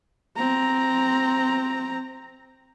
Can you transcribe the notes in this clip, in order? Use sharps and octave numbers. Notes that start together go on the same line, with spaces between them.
C4 A#5